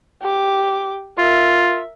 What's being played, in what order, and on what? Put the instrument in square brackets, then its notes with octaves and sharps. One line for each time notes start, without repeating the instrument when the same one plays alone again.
[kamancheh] G4 D6
[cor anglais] F4 [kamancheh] A#4 E5